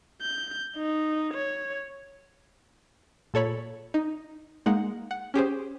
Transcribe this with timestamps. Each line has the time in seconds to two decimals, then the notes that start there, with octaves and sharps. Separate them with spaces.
0.22 G6
0.76 D#4
1.33 C#5
3.34 A#2 A4 C#5 B5
3.94 D#4
4.66 G#3 A#3 D#4 F#5
5.11 F#5
5.34 C#4 G4 G#4 C5